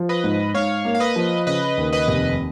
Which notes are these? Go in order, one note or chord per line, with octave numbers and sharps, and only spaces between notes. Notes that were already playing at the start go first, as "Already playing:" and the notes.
Already playing: F3
B4 D#5
G#2
G#2 C#5 F5
A#3
F5
B4 D#5
F3
C#3 B4 D#5
D#2
B4 D#5
F1